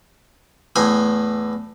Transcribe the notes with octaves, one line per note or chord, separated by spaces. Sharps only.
E2 A2 G#5